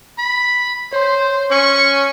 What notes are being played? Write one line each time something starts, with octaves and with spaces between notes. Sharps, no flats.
B5
C5 C#5 C6
C#4 C#6